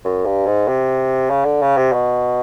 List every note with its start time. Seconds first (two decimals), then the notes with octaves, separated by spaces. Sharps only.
0.05 F#2
0.25 G2
0.46 G#2
0.67 C3
1.30 C#3
1.45 D3
1.61 C#3
1.77 C3
1.92 B2